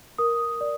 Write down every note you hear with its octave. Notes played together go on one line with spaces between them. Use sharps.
A#4 D#6
D5